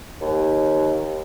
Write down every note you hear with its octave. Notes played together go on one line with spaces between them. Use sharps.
D#2